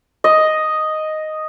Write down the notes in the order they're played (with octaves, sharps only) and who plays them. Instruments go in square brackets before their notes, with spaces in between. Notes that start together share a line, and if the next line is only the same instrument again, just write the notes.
[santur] D#5